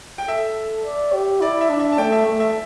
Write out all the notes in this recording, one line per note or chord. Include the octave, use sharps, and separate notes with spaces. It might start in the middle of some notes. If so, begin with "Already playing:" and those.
G5
A4 E5
D5
G4
E4 D5
E5
D4
E5
A5
A3 G5
E5
A3
E5